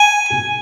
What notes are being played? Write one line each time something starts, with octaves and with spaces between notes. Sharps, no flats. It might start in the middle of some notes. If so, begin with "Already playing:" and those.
Already playing: G#5